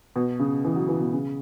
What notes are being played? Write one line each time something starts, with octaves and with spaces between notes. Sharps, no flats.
B2
C#3
E3
F#3
E3
B2
C#3